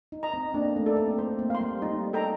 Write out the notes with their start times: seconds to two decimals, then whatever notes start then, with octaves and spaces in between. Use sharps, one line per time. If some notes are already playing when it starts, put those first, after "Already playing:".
0.12 D#4
0.23 D#5 A#5
0.34 C4
0.54 A#3 D4
0.76 A3
0.86 A4 D5
0.97 C4
1.18 C4 C5
1.39 A#3
1.50 F5 C6
1.61 G3
1.82 G3 D#4
2.13 A4 D#5 G5 A#5